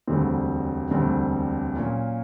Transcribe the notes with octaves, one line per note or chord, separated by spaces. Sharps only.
E1 D2 D3 G3 C4
E1 D2 D3 G3 C4
A#2 F#3 A#3 C#4